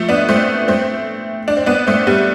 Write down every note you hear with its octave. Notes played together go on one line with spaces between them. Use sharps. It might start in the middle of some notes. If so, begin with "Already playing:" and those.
Already playing: F3 A3
B3 D4
A3 C4
A3 C4
D4
C4
B3 D4
A3 C4
G3 B3